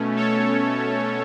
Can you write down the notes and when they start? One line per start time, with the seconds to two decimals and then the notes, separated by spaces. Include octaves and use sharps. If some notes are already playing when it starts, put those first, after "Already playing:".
Already playing: B2 A3 C#4
0.16 A4 C#5